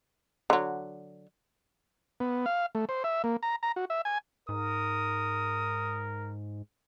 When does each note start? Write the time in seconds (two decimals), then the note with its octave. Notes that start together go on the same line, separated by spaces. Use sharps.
0.50 D3 F#3
2.20 B3
2.46 F5
2.75 A3
2.89 C5
3.04 E5
3.24 A#3
3.43 A#5
3.63 A#5
3.76 F#4
3.90 E5
4.05 G#5
4.49 G#2 A#4 D#6